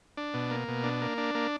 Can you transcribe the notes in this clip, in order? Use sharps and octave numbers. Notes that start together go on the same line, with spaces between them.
D4
B2
A#3
B2
D4
A#3
D4
A#3